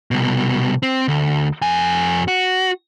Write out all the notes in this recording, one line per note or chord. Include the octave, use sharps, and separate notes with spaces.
C2 B2
C4
D2
F2 G#5
F#4